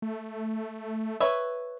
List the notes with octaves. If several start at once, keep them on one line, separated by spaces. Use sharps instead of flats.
A3
B4 C#5 E5